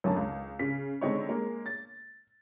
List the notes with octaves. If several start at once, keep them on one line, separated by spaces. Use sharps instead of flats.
B1 F#2 D3 A5
C#2
C#3 B6
D3 G#3 C4 D4 D#4 C#5
G#3 A#3
A6